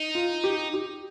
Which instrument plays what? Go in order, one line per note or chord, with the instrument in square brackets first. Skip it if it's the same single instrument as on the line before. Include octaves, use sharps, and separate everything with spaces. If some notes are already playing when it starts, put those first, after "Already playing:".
Already playing: [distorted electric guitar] D#4
[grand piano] F4
G4
G4